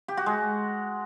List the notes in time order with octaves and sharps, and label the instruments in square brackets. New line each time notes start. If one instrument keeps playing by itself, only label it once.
[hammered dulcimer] G4
F#4
G#3